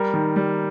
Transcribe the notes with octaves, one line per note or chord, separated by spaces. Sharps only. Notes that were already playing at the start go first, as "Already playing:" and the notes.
Already playing: G3 A#4
D#3
G3